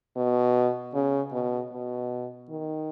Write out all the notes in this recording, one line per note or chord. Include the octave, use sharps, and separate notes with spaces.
B2
C#3
B2
B2
D#3